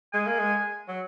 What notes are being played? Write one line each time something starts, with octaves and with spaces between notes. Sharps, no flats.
G#3 G#5
A#3
G#3
F#3